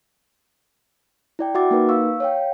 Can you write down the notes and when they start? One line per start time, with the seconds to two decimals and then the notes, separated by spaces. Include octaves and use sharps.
1.39 E4 D5 G5
1.55 F#4 E5 F#5 D6 A6
1.71 A#3 D#4 A#4 B4
1.89 F5 C#6 E6
2.20 C#5 F5 G5